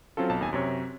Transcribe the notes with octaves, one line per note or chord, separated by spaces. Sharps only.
F#3 C4 C#4 F4 A4
B1 A5
D#2 G#5
F#2 C3 C#5